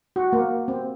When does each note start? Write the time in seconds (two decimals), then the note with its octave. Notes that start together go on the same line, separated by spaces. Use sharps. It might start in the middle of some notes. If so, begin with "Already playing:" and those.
0.16 F#4
0.33 A#3
0.68 C4